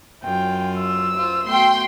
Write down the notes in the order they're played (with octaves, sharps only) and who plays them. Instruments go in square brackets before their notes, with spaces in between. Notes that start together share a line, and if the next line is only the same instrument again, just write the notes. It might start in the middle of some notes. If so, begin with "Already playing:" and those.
[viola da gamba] F#2 F#3 F4 [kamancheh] G5
[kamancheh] E6
[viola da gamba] F4 C5
[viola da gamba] A3 B3 F#4 [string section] G5 C6